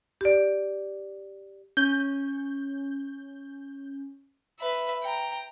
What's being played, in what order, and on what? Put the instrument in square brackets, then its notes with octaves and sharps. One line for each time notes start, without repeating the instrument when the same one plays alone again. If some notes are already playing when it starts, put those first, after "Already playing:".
[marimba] G4 D5
[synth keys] C#4 [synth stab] G6
[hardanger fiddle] B4 E5
G5 A#5